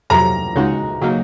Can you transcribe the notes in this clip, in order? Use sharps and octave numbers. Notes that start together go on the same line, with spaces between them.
F2 C3 F#3 A#5
C#2 C#3 G#3 D#4 F#4
C#3 F#3 A#3 D#4